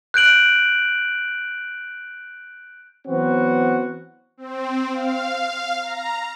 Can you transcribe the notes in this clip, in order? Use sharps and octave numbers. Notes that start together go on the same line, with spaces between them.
F#6 G6 D7 F#7
E3 F#3 B3 C4 F#4
C4
F5
A#5